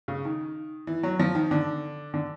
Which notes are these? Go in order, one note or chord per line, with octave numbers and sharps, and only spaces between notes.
C#3
D#3
E3
F#3
F3
D#3
D3
D3